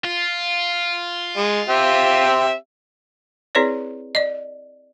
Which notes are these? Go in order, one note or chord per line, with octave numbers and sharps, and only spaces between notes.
F4
G#3
C4 G4 E5
C4 E4 G#4 B4 C#5 D5
D5 D#5